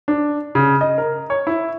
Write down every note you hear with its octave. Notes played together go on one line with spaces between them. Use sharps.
D4
C#3
D#5
A#4
C#5
E4